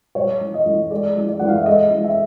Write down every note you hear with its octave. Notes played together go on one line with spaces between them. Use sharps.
G3 C#5
E3
D#5
E3
G#3 D5
E3
D5
E3 F#5
F5
E5
G#3 D#5
E3
E5